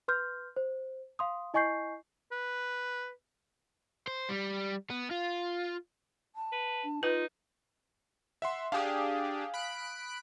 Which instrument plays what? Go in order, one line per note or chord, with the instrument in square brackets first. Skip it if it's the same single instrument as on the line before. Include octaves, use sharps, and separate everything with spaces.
[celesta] B4 C6 F6 G6
C5
F5 C6 D#6
E4 D#5 G#5 C#6 G6 C7
[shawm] B4
[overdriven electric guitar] C5
G3
B3
F4
[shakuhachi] A5
[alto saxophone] B4
[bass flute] D4
[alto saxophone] D#4 [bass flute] F4 [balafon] B4
[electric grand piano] E5 F#5 C6
[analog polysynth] D4 G4 G#4 [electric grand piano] F5 G#5 D#6
[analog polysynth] B5 F#6 D7